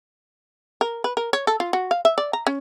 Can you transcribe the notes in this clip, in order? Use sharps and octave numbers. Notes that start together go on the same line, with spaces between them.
A#4
B4
A#4
C#5
A4
F4
F#4
F5
E5
D5
A#5
C#4